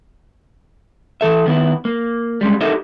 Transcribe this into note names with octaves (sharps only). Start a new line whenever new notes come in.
E3 A4 E5
D#3 B3 E4
A#3
G3 G#3 C#4
D#4 G4 A4 A#4 D#5 E5